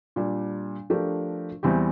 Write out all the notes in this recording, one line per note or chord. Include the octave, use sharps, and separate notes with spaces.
A#2 G3 D4
F3 A3 D4 G4 A#4
E2 E3 G3 C4 G4